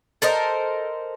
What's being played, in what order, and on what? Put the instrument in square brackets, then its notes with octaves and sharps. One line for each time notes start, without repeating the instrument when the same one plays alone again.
[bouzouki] A4 A#4 C5 D#5